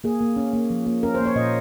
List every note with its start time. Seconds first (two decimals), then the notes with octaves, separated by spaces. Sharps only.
0.04 A#3 G#4
0.21 A#3
0.36 C#4
0.53 A#3
0.70 F3
0.86 A#3
1.03 C#4 A#4
1.15 C5
1.20 A#3
1.26 C#5
1.36 A#2 D#5